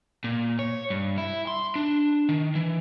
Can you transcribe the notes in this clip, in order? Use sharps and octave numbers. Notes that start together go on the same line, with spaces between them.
A#2
C#5
G2
E4
C6
D4
D#3
E3